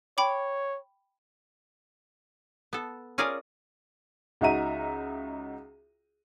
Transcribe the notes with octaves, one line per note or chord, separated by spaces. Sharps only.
C#5 G5 B5 D6
B3 A4
C#4 F4 G#4 A#4 D5 G#5
C#2 D#4 F#4 E5 A#5 D#7